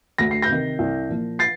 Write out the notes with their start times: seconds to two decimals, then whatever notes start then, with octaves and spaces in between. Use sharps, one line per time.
0.18 D2 A#6
0.31 C7
0.42 G6 A#6
0.49 C3 D#3
0.79 C2
1.09 A#2 F3
1.39 A6 C7